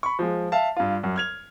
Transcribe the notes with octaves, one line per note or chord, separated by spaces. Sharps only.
B5 C#6
F3 G#3
E5 F5 A5
G2 F4
F#2
F6 G#6 F7